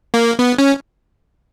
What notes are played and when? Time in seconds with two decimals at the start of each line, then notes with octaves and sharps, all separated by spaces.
0.14 A#3
0.39 B3
0.58 C#4